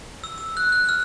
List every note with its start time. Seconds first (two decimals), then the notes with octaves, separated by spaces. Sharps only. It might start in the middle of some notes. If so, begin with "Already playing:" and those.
0.24 E6
0.38 E6
0.57 F#6
0.72 F#6
0.89 F6